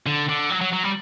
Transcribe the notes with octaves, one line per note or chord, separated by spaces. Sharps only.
D3
D3
F#3
F#3
F#3
G3